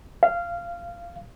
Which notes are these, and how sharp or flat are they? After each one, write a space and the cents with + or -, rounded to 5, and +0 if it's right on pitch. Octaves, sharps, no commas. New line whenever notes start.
F5 -15